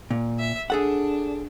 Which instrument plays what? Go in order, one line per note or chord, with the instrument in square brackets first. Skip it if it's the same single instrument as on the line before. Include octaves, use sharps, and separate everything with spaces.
[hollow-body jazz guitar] A#2
[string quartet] E5
[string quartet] D4 [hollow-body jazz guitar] G#4 A4 F#5